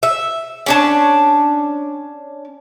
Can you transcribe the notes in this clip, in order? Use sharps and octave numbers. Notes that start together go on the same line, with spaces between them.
E5
C#4 D4 A5